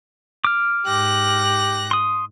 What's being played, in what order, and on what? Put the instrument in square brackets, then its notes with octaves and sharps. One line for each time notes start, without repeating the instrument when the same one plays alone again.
[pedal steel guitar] D6 F6
[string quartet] G#2 F#6 A#6 [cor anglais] G4
[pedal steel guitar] C6 D#6